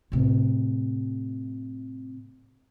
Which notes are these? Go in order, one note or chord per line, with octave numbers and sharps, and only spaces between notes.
A2 C3